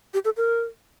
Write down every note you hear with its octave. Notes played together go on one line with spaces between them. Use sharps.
G4
A4
A#4